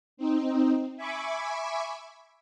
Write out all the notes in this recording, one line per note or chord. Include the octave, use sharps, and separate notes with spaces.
C4 D#4
E5 G#5 B5 C#6 D6